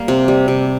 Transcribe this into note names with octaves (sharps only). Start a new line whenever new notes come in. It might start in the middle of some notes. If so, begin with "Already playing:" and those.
Already playing: G3 A#3
C3
G3
C3